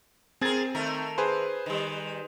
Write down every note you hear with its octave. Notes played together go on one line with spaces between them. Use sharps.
C4 G#4 A#4 G#6 A6
D#3 A3 A#4
G#4 B4 C5
D#3 G3